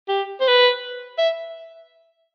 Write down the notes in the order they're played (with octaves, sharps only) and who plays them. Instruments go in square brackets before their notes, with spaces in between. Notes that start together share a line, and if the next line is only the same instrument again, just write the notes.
[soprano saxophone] G4
C5
B4
E5